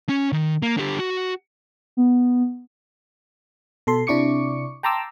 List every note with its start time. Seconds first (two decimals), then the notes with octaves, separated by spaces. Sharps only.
0.09 C#4
0.32 D#3
0.62 A#3
0.77 D3 G4
0.99 F#4
1.97 B3
3.87 B2 A4 C6
4.07 C3 D4 E4 C#6 D6 C#7
4.83 G5 A5 A#5 C6 D6 E6